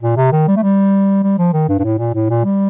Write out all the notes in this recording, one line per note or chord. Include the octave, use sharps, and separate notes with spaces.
A#2
C3
D#3
G3
A3
G3
G3
F3
D#3
G2
G2
A2
A#2
A2
A#2
G3